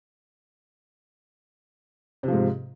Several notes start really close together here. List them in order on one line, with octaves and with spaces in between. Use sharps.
C3 F3 G#2